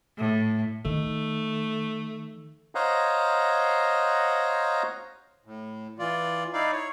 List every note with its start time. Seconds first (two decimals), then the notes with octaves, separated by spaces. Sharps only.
0.18 A2
0.85 D#3 A3
2.75 C5 C#5 D#5 F5 F#5 A#5
5.45 A2
5.99 E3 F4 D5
6.53 D#4 E4 D5 F5
6.72 C#5